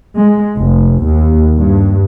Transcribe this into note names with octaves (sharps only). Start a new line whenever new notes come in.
G#3
F1
D#2
G2